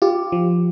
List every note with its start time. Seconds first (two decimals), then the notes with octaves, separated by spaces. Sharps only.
0.02 F4 G4
0.32 F3